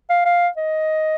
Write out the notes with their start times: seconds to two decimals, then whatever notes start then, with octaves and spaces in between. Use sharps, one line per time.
0.10 F5
0.26 F5
0.57 D#5